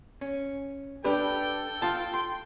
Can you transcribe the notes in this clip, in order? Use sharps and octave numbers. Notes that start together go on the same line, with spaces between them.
C#4
D4 G4 A4 B4 G5
F4 A5
C6